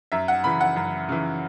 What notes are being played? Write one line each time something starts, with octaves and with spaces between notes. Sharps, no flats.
F#2 E5
F#5
C#3 E3 B5
F#5
F#2
C#3 E3